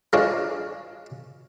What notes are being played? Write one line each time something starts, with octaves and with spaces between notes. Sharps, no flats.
G#3 D4 F4 C#5